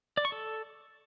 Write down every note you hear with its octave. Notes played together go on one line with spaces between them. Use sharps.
D5
C#6
A4